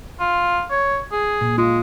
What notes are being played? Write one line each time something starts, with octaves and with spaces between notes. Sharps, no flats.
F4
C#5
G#4
A#2
G#3 F4